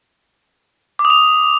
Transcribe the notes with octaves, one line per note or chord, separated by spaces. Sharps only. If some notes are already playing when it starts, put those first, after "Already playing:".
D6
D#6
F7